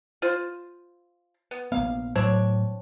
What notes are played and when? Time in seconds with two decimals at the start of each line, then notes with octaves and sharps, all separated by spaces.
0.22 F4 C5
1.51 B3
1.72 A#1 A#3 B3 F5
2.15 A2 F#3 C4 D4 C#5